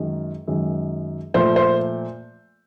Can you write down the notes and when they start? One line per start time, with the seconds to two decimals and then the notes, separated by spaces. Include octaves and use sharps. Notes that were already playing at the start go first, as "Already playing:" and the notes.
Already playing: F#2 D#3 G#3
0.48 F#2 D#3 G#3
1.34 A#2 F3 A3 C5
1.56 C5